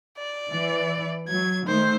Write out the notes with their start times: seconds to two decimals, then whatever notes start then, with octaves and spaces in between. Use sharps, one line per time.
0.18 D5
0.50 E3
1.28 F#3 G#6
1.67 D#3 A3 C5